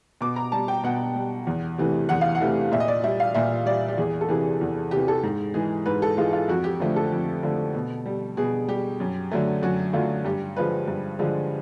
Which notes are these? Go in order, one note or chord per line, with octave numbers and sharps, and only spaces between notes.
B2 D6
A#5
G3 A5
G5
B2 F#5
G3
E2
C3 E3 A3
E2 F#5
F5
F#5
C3 E3 A3
A#2 E5
D#5
D5
G3 E5
F5
A#2 E5
G3 D5
G4
E2 G#4
A4
C3 E3 G#4
E2
C3 E3 G4
A4
G#2
E3 G#3 G#4
G#2 B4
A4
E3 G#3 F4
F4
F2 F#4
G4
D3 F3 A3
A4
F2
D3 F3 A3
B2
G3
B2 G#4
G3 G4
F#2
D3 F#3 A3
F#2 F#4
D3 F#3 A3 F4
G2 G4
D3 F3 G#3 B4
G2
D3 F3 G#3